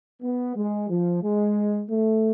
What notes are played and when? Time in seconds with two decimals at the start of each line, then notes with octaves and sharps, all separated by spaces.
0.22 B3
0.56 G#3
0.90 F3
1.23 G#3
1.90 A3